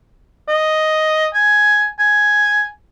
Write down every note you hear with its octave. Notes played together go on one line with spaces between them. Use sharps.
D#5
G#5
G#5